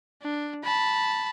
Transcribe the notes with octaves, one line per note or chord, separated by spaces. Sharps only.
D4
A5 B5